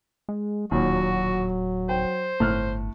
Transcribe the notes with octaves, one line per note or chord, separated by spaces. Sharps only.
G#3
D1 D#2 A#2 F#3 F#4
C5 G5
G1 A2 F6 F#6